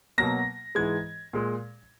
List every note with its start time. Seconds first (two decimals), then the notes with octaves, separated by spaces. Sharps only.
0.18 B2 F#3 A#3 A#6
0.75 G#2 E3 G#3 G#6
1.33 A#2 G#3